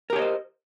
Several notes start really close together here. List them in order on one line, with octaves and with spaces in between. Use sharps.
A#4 G4 C#5 D#5 C5